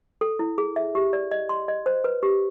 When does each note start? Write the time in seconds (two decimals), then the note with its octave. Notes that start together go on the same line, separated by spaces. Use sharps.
0.21 A4
0.39 E4
0.58 G#4
0.76 E5
0.95 G4
1.13 D5
1.31 D#5
1.49 C6
1.68 D#5
1.86 C5
2.04 B4
2.23 G4